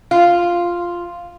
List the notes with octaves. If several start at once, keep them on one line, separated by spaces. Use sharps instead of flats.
F4